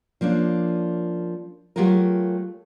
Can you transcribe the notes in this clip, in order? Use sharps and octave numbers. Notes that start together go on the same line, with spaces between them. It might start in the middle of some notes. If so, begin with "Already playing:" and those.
F3 A#3 C#4 D4
F#3 A3 F4 G4 G#4 A#4